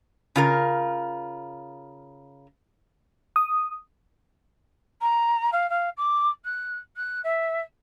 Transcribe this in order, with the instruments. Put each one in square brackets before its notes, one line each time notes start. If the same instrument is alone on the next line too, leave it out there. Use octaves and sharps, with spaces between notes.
[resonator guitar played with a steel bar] C#3 F4 A#4
[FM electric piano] D#6
[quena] A#5
F5
F5
D6
F#6
F#6
E5